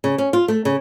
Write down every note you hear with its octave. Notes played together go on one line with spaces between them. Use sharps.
C#3
C#4
F4
A3
C#3